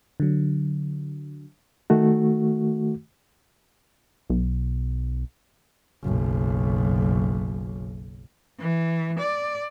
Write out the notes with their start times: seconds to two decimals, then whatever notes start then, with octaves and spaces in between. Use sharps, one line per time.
0.20 D3 F#3
1.90 D#3 A3 F#4
4.30 B1
6.03 F#1 B1
8.60 E3
9.19 D5